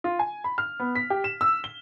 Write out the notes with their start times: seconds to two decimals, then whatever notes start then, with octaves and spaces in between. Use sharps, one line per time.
0.04 F4
0.19 G#5
0.44 B5
0.58 F6
0.80 B3
0.95 B6
1.10 G4
1.24 E7
1.41 E6
1.64 G7